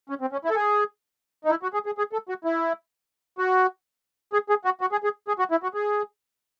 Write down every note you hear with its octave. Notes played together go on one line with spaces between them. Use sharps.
C#4
C4
C#4
E4
A4
G#4
D#4
E4
F#4
G#4
G#4
G#4
A4
F#4
E4
F#4
G#4
G#4
F#4
F#4
G#4
G#4
G#4
F#4
E4
F#4
G#4